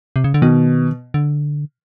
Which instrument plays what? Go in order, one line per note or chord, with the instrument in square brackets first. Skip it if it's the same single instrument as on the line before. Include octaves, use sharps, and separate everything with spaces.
[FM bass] C3
C#3
D3
[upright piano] B2 [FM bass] D#3
[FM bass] D3